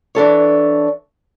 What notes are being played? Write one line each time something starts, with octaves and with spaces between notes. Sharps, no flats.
E3 D4 A4 C#5